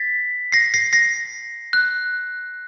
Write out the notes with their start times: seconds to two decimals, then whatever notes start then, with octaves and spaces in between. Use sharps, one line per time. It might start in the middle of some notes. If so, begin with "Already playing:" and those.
Already playing: A6 B6
0.52 A#6 C7
0.74 A#6 C7
0.93 A#6 C7
1.73 F#6